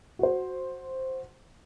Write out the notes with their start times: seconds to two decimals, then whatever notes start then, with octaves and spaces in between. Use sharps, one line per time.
0.19 F#4 C5